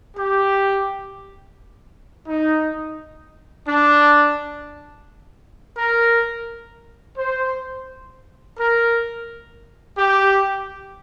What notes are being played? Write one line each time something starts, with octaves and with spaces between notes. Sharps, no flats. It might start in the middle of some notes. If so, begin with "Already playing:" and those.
G4
D#4
D4
A#4
C5
A#4
G4